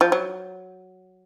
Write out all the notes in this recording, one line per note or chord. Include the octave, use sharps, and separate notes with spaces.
F3
F#3